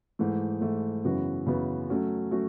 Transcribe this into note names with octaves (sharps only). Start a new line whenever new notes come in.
G#2 E3 A3
G#2 E3 A3
F#2 C#3 E3 B3 F#4
F#2 C#3 E3 B3 F#4
F#3 A3 C#4 F#4
F#3 A3 C#4 F#4